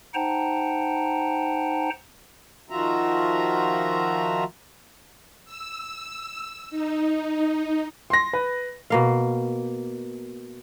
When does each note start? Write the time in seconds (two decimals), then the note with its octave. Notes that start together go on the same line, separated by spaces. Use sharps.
0.14 D#4 C5 F#5 G5 A5 A#5
2.70 D#3 F3 F4 F#4 E5 A#5
5.45 E6
6.70 D#4
8.10 C6 A#6
8.33 B4
8.90 B2 A#3 F5